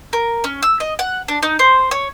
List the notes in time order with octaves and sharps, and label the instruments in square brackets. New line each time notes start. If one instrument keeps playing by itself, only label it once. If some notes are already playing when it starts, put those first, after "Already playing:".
[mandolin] A#4
C#4
E6
D#5
F#5
D4
D#4
C5
C#5